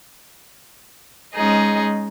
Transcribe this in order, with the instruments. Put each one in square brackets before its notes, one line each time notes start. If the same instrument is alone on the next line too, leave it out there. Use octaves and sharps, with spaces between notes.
[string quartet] G#3 C#4 D#4 G#4 D#5